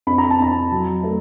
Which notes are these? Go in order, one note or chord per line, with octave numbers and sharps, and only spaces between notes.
F2 B5
A#5
A5
F2 A#5
F#3
A3